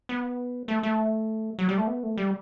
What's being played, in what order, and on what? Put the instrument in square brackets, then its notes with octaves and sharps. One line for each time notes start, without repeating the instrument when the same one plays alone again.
[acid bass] B3
A3
A3
F#3
G3
A3
B3
A3
G3